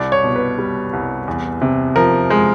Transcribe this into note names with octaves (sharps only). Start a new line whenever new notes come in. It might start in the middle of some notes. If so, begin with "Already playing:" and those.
Already playing: C2 D5
C#5
B2
B4
G3
C2
E2
C3
F3 A#4
G#3